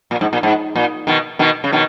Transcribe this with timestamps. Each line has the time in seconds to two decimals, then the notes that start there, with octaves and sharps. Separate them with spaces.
0.11 A#2
0.21 G#2
0.33 A#2
0.43 G#2
0.76 A#2
1.07 B2 D#3
1.39 B2 D#3
1.64 C#3
1.72 B2 D#3